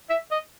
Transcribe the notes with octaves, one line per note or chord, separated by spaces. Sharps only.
E5
D#5